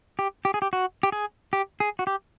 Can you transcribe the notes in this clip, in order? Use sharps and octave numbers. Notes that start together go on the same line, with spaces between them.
G4
G4
G#4
G4
F#4
G4
G#4
G4
G#4
F#4
G4